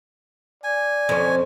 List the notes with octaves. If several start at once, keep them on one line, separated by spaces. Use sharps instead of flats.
D5 G#5
F2 C#4